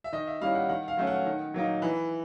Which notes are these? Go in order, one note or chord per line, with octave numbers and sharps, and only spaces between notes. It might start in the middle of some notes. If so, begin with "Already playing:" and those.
E5
D#3 D#5
E5
G3 A#3 C#4 E4 F5
F#5
D#3 F#5
F5
F#3 A3 C#4
F#5
D#3
F#3 A#3 D#4
E3